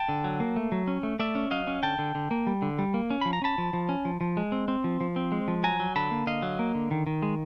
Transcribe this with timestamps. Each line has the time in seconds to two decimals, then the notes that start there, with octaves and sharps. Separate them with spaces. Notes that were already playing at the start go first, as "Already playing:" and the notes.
Already playing: G5 A5
0.09 D3
0.24 F#3
0.40 A#3
0.56 A3
0.72 F#3
0.88 C#4
1.03 A3
1.19 A3 D5 E5
1.35 C#4
1.51 F#3 D#5 F5
1.67 C#4
1.83 D3 G5 A5
1.99 D3
2.15 D3
2.31 A#3
2.47 G3
2.62 D3
2.79 G3
2.94 A#3
3.10 C#4
3.21 F3 B5
3.33 A#5
3.42 C#4 A5 B5
3.58 F3
3.73 F3
3.89 C#4
4.05 F3
4.21 F3
4.37 G#3
4.52 C4
4.68 C4
4.84 F3
5.01 F3
5.16 C4
5.32 G#3
5.48 F3
5.64 F#3 G#5 A#5
5.80 F#3
5.96 D3 A5 B5
6.11 A#3
6.27 D3 D#5 F5
6.42 F#3
6.59 A#3
6.75 D3
6.91 D#3
7.07 D#3
7.22 G#3